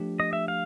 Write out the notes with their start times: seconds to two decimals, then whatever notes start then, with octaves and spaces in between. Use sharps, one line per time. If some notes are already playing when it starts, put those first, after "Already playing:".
Already playing: F3 A3 D4 G4
0.20 D#5
0.33 E5
0.48 F5